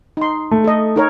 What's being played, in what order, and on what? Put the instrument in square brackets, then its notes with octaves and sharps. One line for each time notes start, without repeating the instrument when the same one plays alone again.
[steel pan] D#4 C6
[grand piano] A3
[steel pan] A4 D#5
D#4 A#4 C#5